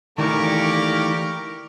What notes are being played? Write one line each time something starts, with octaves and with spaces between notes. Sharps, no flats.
D#3 E3 A3 A#3 G4 A#4 D5 C#6